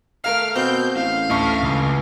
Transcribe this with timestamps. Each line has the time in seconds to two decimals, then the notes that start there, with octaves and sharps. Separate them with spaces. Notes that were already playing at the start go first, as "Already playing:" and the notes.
0.24 A3 A#4 F5 F6
0.56 B2 C4 G6
0.95 A1 F5
1.30 D2 E4 A4 C#6
1.63 C#2